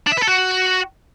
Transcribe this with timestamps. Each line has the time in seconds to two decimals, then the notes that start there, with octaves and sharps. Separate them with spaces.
0.07 D4
0.12 E5
0.17 B4
0.23 A4
0.28 F#4